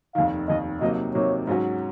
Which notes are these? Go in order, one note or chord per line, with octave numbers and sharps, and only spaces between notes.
F1 D#2 D#3 F5
F1 D#2 D#3 D#5
C3 F#3 A#3 D#4 D#5
C3 F#3 A#3 D#4 C#5
G#2 F#3 C#4 F#4